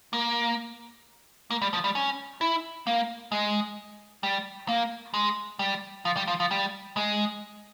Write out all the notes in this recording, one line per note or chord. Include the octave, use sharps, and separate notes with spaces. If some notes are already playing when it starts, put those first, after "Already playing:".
A#3
A#3
G3
F3
G3
C#4
E4
A#3
G#3
G3
A#3
G#3
G3
F3
G3
F3
F3
G3
G#3